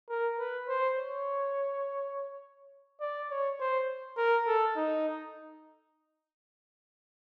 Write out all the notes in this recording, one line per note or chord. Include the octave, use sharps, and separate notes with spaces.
A#4
B4
C5
C#5
D5
C#5
C5
A#4
A4
D#4